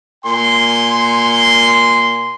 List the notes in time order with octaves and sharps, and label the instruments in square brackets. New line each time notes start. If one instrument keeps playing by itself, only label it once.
[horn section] A#2 G#5 C6